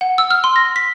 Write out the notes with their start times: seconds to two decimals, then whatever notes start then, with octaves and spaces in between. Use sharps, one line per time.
0.01 F#5
0.18 E6
0.31 F6
0.44 C6
0.56 A#6
0.76 B6